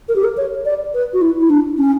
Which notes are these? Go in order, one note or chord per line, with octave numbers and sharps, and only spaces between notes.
A#4
G4
A#4
C#5
D5
B4
F#4
E4
E4
D4
C#4